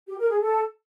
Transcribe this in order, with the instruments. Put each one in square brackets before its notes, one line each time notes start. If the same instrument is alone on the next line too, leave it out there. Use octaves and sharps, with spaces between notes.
[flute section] G4
A#4
G#4
A4